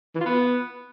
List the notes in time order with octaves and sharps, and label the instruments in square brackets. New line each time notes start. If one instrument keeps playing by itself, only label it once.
[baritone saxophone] E3
F4
B3